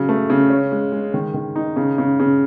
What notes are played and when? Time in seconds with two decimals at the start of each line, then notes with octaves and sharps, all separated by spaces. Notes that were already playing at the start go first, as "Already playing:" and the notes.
Already playing: C#3 F#3
0.09 A3
0.30 C#3
0.50 C#4
0.72 G#3
0.92 G#3
1.14 D#3
1.34 D#3
1.56 D#4
1.76 C#3
1.98 C#3
2.20 C#3